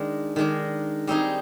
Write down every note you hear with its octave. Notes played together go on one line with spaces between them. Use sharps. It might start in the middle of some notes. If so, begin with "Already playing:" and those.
Already playing: D#3 G#3 D4
D#3 G#3 D4
G3 C4 D#4 G#4